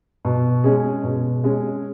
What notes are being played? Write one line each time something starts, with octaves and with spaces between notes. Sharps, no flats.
B2
G#3 C#4 G#4
B2
G#3 C#4 G#4